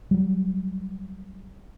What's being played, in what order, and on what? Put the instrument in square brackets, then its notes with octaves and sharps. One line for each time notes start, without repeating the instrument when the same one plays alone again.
[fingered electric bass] F#3 G3